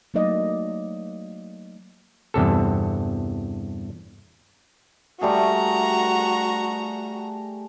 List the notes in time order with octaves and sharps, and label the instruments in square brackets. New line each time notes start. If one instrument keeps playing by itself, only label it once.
[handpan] F#3 A3 A#3 D#4 D5 D#5
[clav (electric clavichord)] E2 G2 C3 A4
[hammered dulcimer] G3 A3 G#4 [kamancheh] F#4 A#5